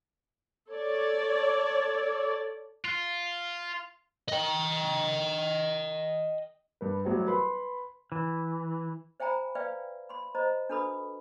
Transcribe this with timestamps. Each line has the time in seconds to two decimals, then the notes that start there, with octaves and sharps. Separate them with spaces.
0.69 A4 C#5 D5
2.85 F4
4.28 D#5 G5
6.81 G2 B4
7.05 A1 F#3 G3 C5
7.27 B4 B5 C6
8.12 E3
9.20 C5 E5 G5 G#5 A#5 B5
9.55 B4 D5 E5 F5 G5
10.09 B5 C6
10.35 C5 D#5 A#5
10.69 D4 F#4 A4 B4 B5 D#6